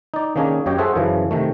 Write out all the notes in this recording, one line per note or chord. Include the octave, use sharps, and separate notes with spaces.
D#4 D5
D#3 A#3 C#4 D4 G#4
F#2 G4 C#5 D#5 G5
G#4 A4 C5 E5 F#5
F#2 C#3 E3 F3
C3 D#3 A3